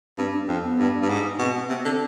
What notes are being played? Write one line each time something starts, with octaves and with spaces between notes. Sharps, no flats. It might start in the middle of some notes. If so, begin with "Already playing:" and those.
G2 C4
D4
F2 C4
B3
G2
G2
G#2
B2 C4
C3 B3
D3 C4